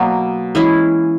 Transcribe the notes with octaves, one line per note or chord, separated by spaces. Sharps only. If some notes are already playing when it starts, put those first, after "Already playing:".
Already playing: B2 F#3 A#3
E3 G#3 C#4 E4